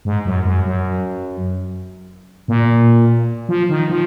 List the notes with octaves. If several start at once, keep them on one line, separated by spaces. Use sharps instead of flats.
G#2
F#2
F#2
F#2
A#2
F3
D#3
F3